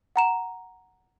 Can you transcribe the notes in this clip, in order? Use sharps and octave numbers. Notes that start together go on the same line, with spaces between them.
F#5 A#5 E7